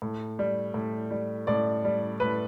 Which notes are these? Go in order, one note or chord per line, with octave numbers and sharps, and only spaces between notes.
A2
G3
A2
G3
A2 D5
G3
A2 B4